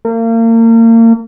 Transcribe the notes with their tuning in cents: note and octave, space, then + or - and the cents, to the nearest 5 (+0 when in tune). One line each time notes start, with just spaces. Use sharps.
A#3 -35